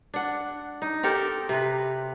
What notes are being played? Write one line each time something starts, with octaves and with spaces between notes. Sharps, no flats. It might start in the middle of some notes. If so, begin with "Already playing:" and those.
D4 F#5
D#4
C4 G4 A4 A#4
C3 B4